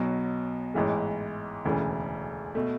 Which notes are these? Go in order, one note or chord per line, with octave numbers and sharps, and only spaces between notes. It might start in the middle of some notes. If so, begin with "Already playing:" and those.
Already playing: B1 B2 F#3
A1 G#2 E3 G#3
E1 D2 C#3 E3
B2 A3